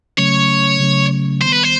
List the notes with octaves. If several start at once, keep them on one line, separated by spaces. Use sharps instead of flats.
C#3 F#3 A3 C#4 C#5
C#3 F#3 A3 C#4
D#3 G3 B3 C5
B4
C5